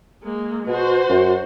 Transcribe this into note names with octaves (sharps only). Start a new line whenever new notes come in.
G#3 A#3
B2 F#4 C5
F#2